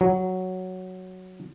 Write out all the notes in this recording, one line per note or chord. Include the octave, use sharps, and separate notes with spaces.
F#3